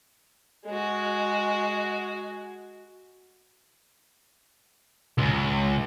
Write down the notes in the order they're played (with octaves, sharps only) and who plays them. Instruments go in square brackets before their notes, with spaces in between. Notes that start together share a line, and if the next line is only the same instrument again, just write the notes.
[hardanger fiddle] G#3 F#4
[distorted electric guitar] C#2